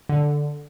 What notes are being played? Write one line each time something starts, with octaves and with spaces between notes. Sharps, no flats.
D3